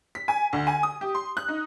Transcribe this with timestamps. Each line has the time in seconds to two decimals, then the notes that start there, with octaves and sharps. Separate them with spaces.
0.15 B6
0.28 G#5
0.53 D2
0.67 G#5
0.83 D#6
1.01 G4
1.15 C6
1.37 F#6
1.48 D#4